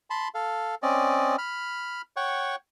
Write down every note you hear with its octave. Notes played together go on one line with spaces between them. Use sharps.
A5 B5 C6
A4 F5
C4 C#4 D5 D#5
B5 F6
C#5 F#5 G5 C#6